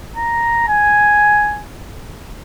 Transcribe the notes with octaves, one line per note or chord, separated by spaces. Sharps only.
A#5
G#5